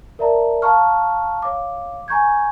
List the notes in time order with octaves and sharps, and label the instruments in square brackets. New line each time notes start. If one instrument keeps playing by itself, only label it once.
[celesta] A#4 D5 E5 A5 A#5
F5 A5 A#5 C#6 F6
C#5 F5 D6
G#5 A#5 C#6 G6 G#6